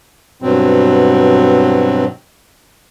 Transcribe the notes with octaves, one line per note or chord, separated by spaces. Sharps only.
G2 B2 F#3 C4